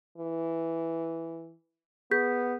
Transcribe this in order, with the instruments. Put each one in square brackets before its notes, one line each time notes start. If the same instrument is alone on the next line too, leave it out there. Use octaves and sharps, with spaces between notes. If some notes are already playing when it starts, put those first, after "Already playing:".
[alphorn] E3
[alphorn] B3 [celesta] G#4 G6 B6